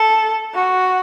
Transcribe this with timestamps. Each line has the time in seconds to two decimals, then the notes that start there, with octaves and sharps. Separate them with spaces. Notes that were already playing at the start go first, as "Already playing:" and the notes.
Already playing: A4
0.55 F#4